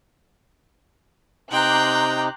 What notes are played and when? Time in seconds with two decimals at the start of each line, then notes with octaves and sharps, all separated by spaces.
1.52 C3 D#4 G5 A#5 C6 D6 F#6